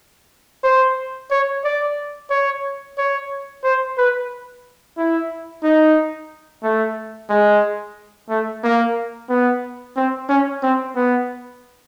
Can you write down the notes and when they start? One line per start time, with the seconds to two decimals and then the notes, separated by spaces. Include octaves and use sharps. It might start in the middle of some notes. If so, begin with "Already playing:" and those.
0.64 C5
1.31 C#5
1.64 D5
2.30 C#5
2.98 C#5
3.64 C5
3.98 B4
4.97 E4
5.64 D#4
6.63 A3
7.29 G#3
8.29 A3
8.64 A#3
9.29 B3
9.97 C4
10.29 C#4
10.63 C4
10.96 B3